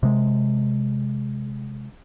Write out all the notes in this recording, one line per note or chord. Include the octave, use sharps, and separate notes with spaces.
C3 G#3